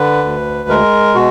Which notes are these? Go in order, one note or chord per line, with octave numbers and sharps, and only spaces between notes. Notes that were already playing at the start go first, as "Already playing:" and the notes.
Already playing: D3 B4
D2
G#3 A#4
B2 F#4